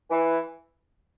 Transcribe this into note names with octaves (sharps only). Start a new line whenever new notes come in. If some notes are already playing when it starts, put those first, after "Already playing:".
E3